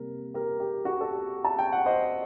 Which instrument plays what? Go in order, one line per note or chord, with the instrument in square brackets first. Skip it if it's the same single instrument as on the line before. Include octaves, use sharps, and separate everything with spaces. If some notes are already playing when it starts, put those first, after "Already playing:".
Already playing: [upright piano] C3 G3 A#3 A#4
G4 A#4
G4
F#4
A4
G4
A5
G5
F#5
C5 D#5